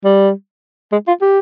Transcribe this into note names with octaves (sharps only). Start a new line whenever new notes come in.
G3
G#3
F4
G4